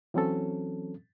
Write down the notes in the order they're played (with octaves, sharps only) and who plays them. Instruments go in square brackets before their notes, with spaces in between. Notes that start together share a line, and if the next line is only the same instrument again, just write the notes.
[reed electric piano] E3 F#3 C4 C#4 A4